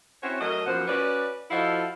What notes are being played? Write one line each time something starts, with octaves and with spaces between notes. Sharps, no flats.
C4 C#4 E4 F#4 C5 C#5
F#3 A3 A#4 D#5
F#2 B2 F3 A#3 C5 F#5
C#4 F#4 B4 D5
F3 E4 F#4 A4 D#5 F5